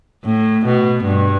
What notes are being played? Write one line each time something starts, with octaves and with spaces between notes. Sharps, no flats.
A2
B2
G2